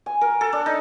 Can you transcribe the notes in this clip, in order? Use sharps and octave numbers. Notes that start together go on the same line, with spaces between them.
G#5
A#4
A4
D4
D#4